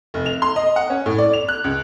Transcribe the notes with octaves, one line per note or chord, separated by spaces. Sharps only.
F1
F7
C6
D#5
F#5
C#4
A2
D5
F7
F#6
C#2